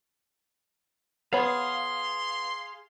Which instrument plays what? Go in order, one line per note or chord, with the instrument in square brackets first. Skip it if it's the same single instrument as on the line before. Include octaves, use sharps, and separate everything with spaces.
[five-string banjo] B3 C#5 B5 [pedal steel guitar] G#4 F5 [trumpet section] C6